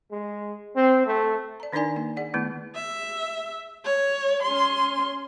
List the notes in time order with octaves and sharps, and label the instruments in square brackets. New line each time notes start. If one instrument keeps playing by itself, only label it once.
[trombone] G#3
C4
A3
[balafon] D5 A#5
D#3 D4 D#4 A#4 D5 G#5
A#3
G#4 D5 F#5
D#3 A3 B3 E4
[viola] E5
C#5
C#4 C6